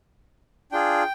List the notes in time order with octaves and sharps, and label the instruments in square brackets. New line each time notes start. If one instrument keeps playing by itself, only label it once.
[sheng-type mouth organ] D4 F4 G#4 G5